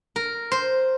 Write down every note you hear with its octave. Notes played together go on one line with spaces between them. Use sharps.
A#4
C5